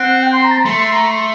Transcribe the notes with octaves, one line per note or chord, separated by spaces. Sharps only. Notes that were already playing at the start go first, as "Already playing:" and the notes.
Already playing: C4 F#5
G5
C6
A#5
A5
A#5
A3 C6
C6
A#5
C6